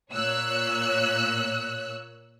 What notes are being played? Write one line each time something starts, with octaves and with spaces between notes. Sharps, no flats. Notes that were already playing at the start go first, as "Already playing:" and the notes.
A#2 C#5 E6 F#6